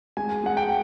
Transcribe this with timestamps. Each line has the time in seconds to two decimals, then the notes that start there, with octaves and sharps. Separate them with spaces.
0.17 G#3 G#5
0.44 G#3 F#5
0.57 G5